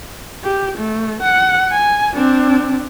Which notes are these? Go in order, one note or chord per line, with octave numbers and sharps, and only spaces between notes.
G4
A3
F#5
G#5
C4 D4